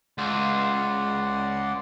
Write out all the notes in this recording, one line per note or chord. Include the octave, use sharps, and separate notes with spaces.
C#2 D5 F#5 C6